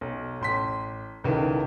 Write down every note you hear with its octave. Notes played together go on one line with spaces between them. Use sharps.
B1
A1 C6 B6
G1 C#2 D#3 E3